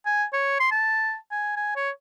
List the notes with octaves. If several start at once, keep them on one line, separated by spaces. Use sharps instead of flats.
G#5
C#5
C6
A5
G#5
G#5
C#5